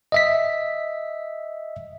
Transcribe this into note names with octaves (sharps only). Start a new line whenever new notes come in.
D#5 E5 B6